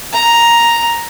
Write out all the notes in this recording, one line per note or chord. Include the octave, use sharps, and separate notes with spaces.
A#5